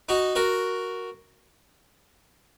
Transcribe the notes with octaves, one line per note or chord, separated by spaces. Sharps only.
D#4 F#4
F#4 A#4